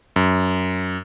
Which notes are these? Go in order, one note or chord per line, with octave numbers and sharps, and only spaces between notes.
F#2